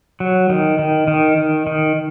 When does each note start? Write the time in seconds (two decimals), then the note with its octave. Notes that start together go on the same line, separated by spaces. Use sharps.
0.20 F#3
0.50 D#3
0.79 D#3
1.08 D#3
1.37 D#3
1.67 D#3